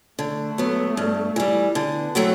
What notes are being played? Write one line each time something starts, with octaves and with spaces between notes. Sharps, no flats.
D3 A3
F#3 B3
G2
E3 G3
D3 B3
F#3 A3 C4 F#4